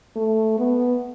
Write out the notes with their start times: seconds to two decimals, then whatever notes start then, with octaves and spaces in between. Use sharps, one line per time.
0.16 A3
0.59 B3